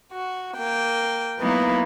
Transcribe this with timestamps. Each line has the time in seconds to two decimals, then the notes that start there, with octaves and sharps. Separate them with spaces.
0.11 F#4
0.56 A#3 G5
1.38 F#3 A#3 B3 D#4 E4